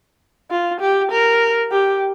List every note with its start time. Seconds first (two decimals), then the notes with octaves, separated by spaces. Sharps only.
0.51 F4
0.80 G4
1.11 A#4
1.72 G4